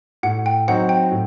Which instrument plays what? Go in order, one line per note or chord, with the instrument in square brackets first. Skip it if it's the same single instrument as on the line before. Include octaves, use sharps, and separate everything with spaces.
[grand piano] A2 [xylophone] F#5
[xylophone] G5
[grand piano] F#3 C4 D#4 [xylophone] F#5
[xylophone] G5
[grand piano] A2